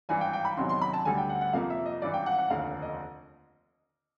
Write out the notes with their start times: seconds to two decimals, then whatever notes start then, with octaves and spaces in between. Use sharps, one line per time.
0.09 G#1 G2 E3 G#5
0.21 G5
0.33 G5
0.45 B5
0.57 E2 C3 D#3 F#3 C6
0.69 C6
0.81 B5
0.93 A5
1.05 D2 D3 G3 G#5
1.18 G5
1.29 F#5
1.41 F#5
1.53 F2 C3 F3 A#3 F5
1.70 E5
1.86 D#5
2.02 G#1 G2 E3 D5
2.14 G5
2.26 F#5
2.39 F#5
2.50 F1 D#2 D3 F5
2.82 D#5